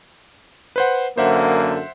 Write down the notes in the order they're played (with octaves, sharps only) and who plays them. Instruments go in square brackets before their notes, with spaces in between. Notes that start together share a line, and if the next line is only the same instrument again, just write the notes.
[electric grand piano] B4 C5 F#5
[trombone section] F#2 D3 A#3 [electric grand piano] C5 E5 F#5